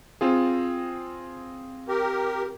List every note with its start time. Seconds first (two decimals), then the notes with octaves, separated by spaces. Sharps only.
0.21 C4 F4 G#4
1.88 G4 A#4